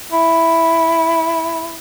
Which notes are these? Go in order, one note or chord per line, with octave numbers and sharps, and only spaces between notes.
E4